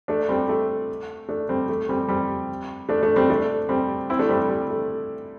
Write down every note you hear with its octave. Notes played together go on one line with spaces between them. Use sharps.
A3 D4
G3 C4
A3
A3 D4
G3 C4
A3
G3 C4
G3 C4
A3 D4
A3 D4
G3 C4
A3 D4
G3 C4
C4 E4
A3 D4
G3 C4
G3
A3